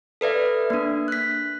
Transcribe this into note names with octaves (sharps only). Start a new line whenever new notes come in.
A4 B4 D5 E5
A#3 D4
F#6 B6